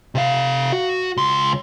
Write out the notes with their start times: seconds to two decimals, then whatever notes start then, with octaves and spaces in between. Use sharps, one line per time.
0.15 C3 F5
0.72 F#4
1.17 C#2 C6